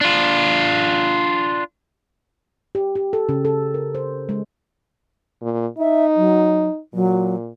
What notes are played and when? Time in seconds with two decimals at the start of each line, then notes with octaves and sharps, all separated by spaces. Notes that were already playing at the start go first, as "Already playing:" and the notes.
0.01 D4 F4
2.75 G4
2.95 G4
3.13 A4
3.29 C#3
3.45 A4
3.74 A#4
3.95 C5
4.29 G#3
5.42 A#2
5.78 D#4 E5
6.16 F#3
6.94 A#2 F#3